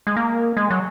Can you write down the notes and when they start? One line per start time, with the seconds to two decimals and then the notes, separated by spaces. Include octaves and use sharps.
0.07 G#3
0.16 A#3
0.57 G#3
0.70 F#3